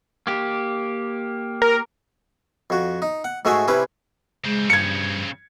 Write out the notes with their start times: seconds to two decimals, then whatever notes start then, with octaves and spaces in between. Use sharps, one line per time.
0.27 A#3 G4
1.62 A#4
2.70 F2 F#4
3.02 D#4
3.24 F#5
3.45 G#2 A3 F#4 G#4 E5 G#5
3.68 C3 C#4 E4 B4 D6
4.44 C#3 G#3 C4
4.70 G2 G#6 C#7